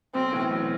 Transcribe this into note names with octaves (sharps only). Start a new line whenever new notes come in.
B1 C4
A2 E3
B1